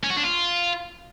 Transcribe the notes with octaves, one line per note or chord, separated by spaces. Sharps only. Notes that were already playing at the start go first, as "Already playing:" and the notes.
C#4
F#4
D4
F4